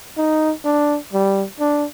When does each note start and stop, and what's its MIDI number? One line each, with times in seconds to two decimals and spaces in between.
0.17 0.52 63
0.65 0.98 62
1.13 1.44 55
1.60 1.85 62